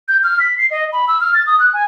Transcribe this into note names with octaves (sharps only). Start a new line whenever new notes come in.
G6
F6
B6
C7
D#5
B5
E6
F6
A6
D#6
F#6
G#5